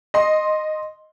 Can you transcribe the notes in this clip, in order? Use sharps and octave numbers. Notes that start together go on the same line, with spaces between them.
D#5 C6